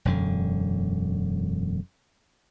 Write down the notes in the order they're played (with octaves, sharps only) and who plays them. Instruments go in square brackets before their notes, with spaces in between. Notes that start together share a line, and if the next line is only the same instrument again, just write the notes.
[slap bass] E1 F#2 D3